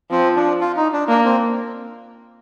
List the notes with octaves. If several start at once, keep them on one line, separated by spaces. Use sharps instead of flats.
F3 C4
D4
F4
D#4
D4
A#3 D4
C4